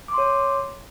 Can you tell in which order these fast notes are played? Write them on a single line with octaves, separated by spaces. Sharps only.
D6 C6 C#5